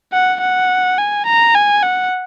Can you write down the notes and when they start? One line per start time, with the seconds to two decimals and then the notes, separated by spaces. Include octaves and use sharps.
0.13 F#5
0.41 F#5
0.98 G#5
1.26 A#5
1.55 G#5
1.83 F#5